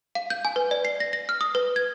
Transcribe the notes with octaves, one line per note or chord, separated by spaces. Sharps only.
F5
G6
G#5
B4
D5
C7
A#6
A#6
F6
D#6
B4
G#6